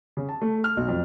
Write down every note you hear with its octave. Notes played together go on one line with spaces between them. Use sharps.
C#3
A5
A3
F6
B1
F2